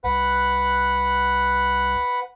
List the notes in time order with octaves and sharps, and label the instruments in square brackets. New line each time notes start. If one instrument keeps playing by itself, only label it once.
[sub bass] C2 [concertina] B4 F#5